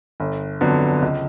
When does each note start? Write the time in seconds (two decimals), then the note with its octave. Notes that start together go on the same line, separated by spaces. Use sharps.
0.20 G1
0.61 F2 D3 F#3 B3
1.02 C#2